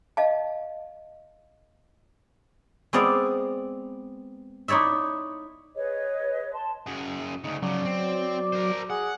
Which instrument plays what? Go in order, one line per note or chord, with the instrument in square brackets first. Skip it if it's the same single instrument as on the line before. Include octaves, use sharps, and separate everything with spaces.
[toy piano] D#5 F5 A5
[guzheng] G#3 B3 C4 D5 F5
D#4 E4 C#5 D5 E5
[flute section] G#4 B4 C#5 D#5
A5 C6
[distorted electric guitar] F#2 G#4
[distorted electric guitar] D2 C#3 [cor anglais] D#4
[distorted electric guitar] C#3 F3 [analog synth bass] F#3 [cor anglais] D5
[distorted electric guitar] C4
A#4 C5
[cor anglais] G#4 [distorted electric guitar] F#5